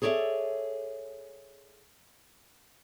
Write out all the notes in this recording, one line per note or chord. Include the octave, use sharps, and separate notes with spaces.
G#4 A4 C#5 D5 E5